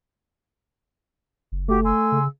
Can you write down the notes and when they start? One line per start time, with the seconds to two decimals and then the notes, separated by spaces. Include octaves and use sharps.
1.52 F#1
1.68 A3 F#4 G4 D6
1.83 G#5 C6 E6
2.12 C#3